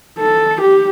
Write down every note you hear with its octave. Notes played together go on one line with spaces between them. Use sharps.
A4
G4